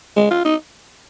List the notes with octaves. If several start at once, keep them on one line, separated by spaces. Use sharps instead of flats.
G#3
F4
D#4